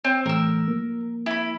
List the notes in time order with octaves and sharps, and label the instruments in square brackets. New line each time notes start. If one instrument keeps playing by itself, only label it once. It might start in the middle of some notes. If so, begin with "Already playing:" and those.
[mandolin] C4 [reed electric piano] C#5
[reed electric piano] A2 E3 A3 [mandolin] A#4 E6
[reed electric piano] F3 A#3
[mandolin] E4 B5